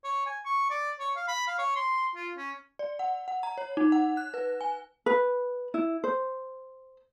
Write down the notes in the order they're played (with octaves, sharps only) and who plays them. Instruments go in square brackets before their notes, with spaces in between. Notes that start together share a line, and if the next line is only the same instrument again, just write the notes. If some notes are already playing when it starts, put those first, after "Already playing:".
[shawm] C#5
G#5
C#6
D5
C#5
F5
B5
F5
C#5
C6
F4
C#4
[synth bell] D5
F#5
F#5
A#5
C#5
D#4
F#5
F#6
B4
G#5
[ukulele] B4
E4
C5